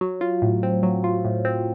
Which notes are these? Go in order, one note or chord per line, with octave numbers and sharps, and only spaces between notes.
F#3
F4
A2
C4
F#3
F4
A2
C4